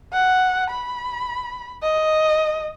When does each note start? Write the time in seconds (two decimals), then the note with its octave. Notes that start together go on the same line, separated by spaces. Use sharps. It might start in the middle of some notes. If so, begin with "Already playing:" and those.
0.13 F#5
0.70 B5
1.83 D#5